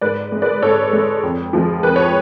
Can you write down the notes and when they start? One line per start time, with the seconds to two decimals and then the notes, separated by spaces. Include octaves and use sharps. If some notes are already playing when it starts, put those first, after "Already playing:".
0.01 G#2 B4 D5
0.32 G#3
0.42 B4 D5
0.62 G#2 A4 C#5
0.93 G#3
1.23 F2
1.53 F3 G#3
1.83 F2 B4
1.96 C#5